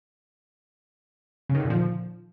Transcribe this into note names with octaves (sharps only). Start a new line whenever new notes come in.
C#3
D#3
D3
A#2
F3